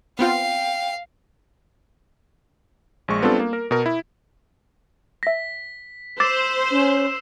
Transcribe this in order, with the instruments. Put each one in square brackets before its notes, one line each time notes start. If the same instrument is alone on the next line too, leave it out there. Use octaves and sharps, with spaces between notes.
[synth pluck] B3 C4 F4 [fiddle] F5 [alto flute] G5
[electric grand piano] A#1 G#3 C#6
G3 B3 C4 D4 F4 A4
A#3
A#4
B2 A#4
E4
[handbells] E5 A#6 [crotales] B6
[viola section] C5 [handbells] D6 A6 [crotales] E6 C7 E7
[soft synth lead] C#4